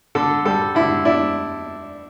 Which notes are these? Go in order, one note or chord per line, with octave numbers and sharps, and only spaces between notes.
D3 A4
G3 A4
D3 E4
D4 E4